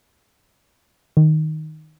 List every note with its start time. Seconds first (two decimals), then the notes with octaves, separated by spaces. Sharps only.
1.17 D#3